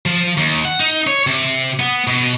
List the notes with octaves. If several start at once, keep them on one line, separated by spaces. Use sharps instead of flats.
F3
D#2
F#5
D#4
C#5
C3
B3
B2